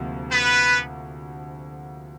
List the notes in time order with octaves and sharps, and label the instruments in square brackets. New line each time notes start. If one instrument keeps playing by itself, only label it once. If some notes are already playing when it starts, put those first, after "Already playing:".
Already playing: [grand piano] D2 C3 F3 A#3
[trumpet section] B3 B4